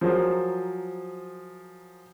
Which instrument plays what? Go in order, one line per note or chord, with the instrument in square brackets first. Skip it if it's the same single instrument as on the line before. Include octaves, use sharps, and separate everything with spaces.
[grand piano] F3 F#3 G#4 A#4 C5